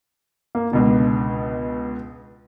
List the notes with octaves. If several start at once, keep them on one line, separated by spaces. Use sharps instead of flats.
A#3
C#2 B2 D3